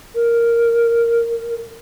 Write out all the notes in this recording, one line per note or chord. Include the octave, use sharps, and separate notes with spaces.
A#4